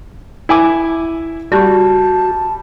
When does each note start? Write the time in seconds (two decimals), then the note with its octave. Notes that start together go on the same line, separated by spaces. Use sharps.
0.49 E4 G#5 D6
1.52 G3 F#4 A5